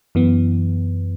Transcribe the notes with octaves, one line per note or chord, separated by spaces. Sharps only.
F#2 E3 B3